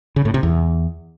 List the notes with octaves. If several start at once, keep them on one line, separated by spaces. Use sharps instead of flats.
C#3
A2
C3
E2